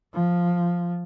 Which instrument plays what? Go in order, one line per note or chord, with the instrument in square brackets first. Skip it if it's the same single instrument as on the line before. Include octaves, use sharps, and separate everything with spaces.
[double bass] F3